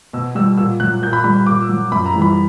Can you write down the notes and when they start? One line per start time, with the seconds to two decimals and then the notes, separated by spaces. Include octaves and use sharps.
0.13 B2 E6
0.35 G3 E6
0.57 A#2 E6
0.80 F#3 F#6
1.02 A#2 G6
1.13 B5
1.24 G3 B5
1.36 B5
1.46 A#2 D6
1.62 E6
1.69 F#3
1.92 F#2 B5
2.06 A#5
2.14 E3 G3
2.22 B5